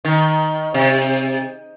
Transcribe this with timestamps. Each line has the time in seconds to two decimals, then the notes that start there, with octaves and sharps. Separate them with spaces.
0.05 D#3
0.74 C3